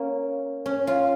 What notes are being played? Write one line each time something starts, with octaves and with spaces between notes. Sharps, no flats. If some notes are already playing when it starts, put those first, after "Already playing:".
Already playing: A#3 C#4
C#4
F4